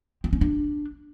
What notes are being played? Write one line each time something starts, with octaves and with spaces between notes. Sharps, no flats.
C4
C#4
D4